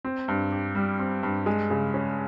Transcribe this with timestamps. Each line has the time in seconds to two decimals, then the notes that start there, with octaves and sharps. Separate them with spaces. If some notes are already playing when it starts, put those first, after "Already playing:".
0.05 C4
0.28 G2
0.52 G4
0.75 G3
0.99 C4
1.23 G2
1.46 G#3
1.70 C#3
1.94 C#4